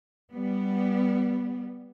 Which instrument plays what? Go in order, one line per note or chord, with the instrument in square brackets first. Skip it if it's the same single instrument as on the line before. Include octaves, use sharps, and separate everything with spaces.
[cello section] G3 B3